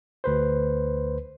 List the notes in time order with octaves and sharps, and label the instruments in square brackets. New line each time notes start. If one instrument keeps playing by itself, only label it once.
[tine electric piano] D2 B4 C5